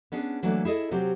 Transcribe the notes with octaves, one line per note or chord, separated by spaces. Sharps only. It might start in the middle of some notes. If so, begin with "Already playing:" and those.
B3 C#4 D4 G#4
E3 F#3 A3 A#3 D4
E4 G#4 A4 D#5
C3 F#3 C4 G4